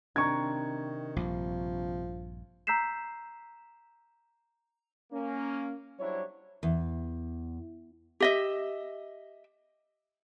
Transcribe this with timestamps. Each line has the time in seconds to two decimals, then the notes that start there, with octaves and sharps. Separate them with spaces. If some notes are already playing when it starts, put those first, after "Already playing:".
0.16 C3 D#3 C4 D4 A#5 C#6 G#6
1.16 A#1 G2 F3
2.67 A#5 E6 G6 B6 C7 E7
5.13 A#3 C#4
5.99 F#3 G3 D4 E4 C5 C#5
6.63 E2
8.20 G4 D#5 E5